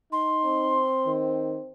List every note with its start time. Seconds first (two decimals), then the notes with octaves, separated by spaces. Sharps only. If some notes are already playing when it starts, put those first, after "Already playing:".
0.12 D#4 C6
0.45 C4
1.06 D#3